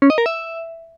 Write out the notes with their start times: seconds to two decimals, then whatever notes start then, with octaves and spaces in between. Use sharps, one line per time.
0.02 C#4
0.10 D#5
0.18 A#4
0.26 E5